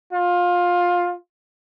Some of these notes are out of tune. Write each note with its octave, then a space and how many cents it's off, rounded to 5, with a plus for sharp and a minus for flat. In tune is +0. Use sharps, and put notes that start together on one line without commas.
F4 +20